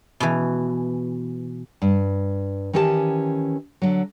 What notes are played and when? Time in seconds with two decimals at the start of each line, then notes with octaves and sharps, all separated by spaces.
0.20 B2 E3
1.82 G2
2.73 D#3 E3 C#4 G4 C#5 A5
3.82 D3 F#3